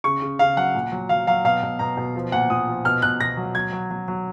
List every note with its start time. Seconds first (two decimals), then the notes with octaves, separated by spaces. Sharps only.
0.04 C#3 C#6
0.22 C#3
0.39 C#3 F5
0.57 F#3 F#5
0.75 A#2
0.92 F#3
1.09 F#3 F5
1.27 F#3 F5
1.44 B2 F5
1.63 B2
1.79 B2 A#5
1.97 B2
2.15 F3
2.32 A#2 F#5
2.50 A#2 D#6
2.67 F3
2.85 B2 F6
3.02 B2 F#6
3.20 B2 A#6
3.37 F#3
3.55 F#3 G#6
3.72 F#3
3.90 F#3
4.08 F#3